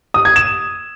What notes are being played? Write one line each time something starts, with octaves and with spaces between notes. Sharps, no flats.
D#6
G#6
E7